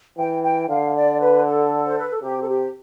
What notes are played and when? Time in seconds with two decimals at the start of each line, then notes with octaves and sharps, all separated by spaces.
0.17 E3 G5
0.43 G5
0.69 D3 F5
0.95 D5
1.20 B4
1.45 A4
1.85 C5
1.98 B4
2.10 A4
2.22 C3 G4
2.41 A4
2.49 G4